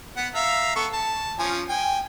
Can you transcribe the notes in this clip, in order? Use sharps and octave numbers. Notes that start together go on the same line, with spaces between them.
B3 F#5
E5 F5 A#5
B3 A4 C#6
A5
F3 C#4 G#5
G5 G#5